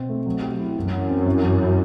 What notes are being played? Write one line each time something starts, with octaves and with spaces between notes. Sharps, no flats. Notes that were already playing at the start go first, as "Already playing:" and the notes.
Already playing: B2 C4
A3
F#3
G4
E4
F#2 E3
F#4
C4
E3
E3
E4